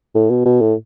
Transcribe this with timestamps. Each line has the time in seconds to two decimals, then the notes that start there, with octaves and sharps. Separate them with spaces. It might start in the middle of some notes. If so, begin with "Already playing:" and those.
0.15 A2
0.30 B2
0.45 B2
0.61 A2